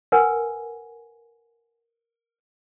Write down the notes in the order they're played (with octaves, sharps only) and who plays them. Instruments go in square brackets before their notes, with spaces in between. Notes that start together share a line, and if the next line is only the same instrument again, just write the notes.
[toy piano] A#4 B4 F#5 G#5